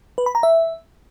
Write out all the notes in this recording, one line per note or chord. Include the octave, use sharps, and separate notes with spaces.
B4
B5
A#5
E5